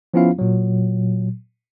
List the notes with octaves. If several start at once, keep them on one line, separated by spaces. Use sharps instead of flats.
F3 B3 C#4 E4 F4 F5
A#2 F#3